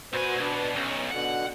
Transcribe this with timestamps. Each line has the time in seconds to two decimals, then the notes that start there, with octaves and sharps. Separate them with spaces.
0.13 A#2 F#4 B4 C5 G#5
0.40 B2 D4 B4
0.76 B1 C#4
1.11 B2 D3 F#5